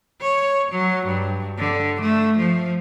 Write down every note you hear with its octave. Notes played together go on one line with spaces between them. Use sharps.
C#5
F#3
G2
D3
A3
F3